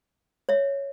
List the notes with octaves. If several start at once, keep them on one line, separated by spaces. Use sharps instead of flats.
C#5 E5